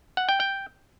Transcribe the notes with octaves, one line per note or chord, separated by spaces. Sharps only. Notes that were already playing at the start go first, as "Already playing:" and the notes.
F#5
G5
G5